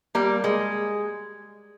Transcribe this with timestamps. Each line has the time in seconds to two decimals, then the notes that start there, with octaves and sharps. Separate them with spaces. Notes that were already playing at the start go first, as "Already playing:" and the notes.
0.15 G3 A#3
0.44 G#3